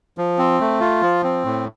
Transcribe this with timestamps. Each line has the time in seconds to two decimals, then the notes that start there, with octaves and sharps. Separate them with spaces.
0.18 F3
0.38 C4
0.60 A3
0.80 F4
1.02 F3
1.24 C4
1.45 A2